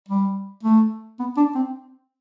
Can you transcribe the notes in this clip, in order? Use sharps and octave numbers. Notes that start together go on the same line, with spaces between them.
G3
A3
B3
D4
C4